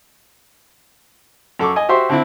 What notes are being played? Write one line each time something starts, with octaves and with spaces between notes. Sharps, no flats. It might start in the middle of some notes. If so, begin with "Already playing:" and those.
F#2 A4 C#6 D6
D#5 G#5
F#4 G4 C5 E5 C6
D3 C4 E4